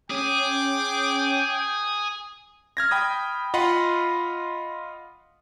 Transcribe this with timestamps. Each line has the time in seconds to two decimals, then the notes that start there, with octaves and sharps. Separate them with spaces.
0.11 C#4 G#4 G5 D6
2.77 F6 G#6 A#6
2.91 G5 B5 D#6
3.54 F4 D#5 F5 F#5 B5 C6